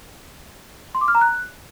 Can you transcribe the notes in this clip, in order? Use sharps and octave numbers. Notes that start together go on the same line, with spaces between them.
C6
D6
F6
A#5
F#6